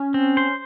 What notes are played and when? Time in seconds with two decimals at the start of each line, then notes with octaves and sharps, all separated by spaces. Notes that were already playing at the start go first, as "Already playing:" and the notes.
Already playing: C#4
0.14 C4
0.37 C5